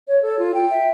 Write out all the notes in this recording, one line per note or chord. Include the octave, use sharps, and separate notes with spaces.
C#5
A4
F4
G5
E5